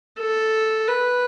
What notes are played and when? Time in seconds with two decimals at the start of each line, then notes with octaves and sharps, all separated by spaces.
0.20 A4
0.88 B4